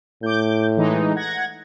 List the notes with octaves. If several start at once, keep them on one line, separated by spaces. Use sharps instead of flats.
A2 D6 G6
E3 G#3 D#4
F#5 G#6 A#6